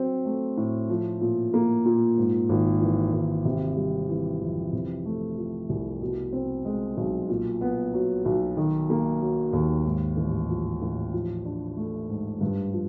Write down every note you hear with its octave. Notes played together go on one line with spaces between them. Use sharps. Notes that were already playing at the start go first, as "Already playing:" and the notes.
Already playing: F#3 C4
A3
A2
F3
A#2
A#3
A#2
G#2
G#1
E3
G#1
C3
G3
E3
F2
C3
A3
F3
C2
B2
C4
G#3
B1
A#2
B3
F#3
B1
D#3
A#3
F#3
D#2
G#2
A1
F3
A1
F3
D4
A3
G#2
G2
F3